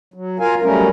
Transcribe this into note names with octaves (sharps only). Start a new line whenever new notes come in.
F#3
F4 A#4 F5 G#5
F#3 G3 A3 C#4 A#4